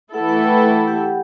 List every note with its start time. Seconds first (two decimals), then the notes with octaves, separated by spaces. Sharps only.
0.14 E3 A3 E4 A4 F#5
0.29 F#5
0.43 G5
0.58 F#5
0.73 F#5
0.88 G4